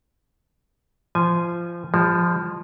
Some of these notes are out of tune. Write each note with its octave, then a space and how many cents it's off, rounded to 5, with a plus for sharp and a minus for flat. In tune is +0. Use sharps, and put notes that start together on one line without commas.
F3 -20 G#5 +0
F3 +0 G#3 -45